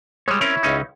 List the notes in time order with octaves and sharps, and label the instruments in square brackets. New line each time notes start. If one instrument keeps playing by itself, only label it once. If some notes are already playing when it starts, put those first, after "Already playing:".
[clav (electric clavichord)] G3 G#3 [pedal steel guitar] C#5
[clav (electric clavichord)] C4 C#4 A#4 [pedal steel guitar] E4 C#5
[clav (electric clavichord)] C#2 C#4 D#4